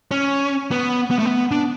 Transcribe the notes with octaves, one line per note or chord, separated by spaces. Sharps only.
C#4
B3
B3
A3
B3
D4